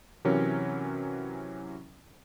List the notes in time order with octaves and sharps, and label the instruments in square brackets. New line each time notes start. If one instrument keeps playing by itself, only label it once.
[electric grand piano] C3 E3 F#3 C#4 A#4